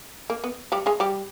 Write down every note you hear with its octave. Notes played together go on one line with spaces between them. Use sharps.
A#3
B3
G3 G4
G#3 G#4
G3 G4